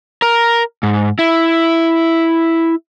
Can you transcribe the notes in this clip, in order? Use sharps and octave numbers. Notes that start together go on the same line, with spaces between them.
A#4
G#2
E4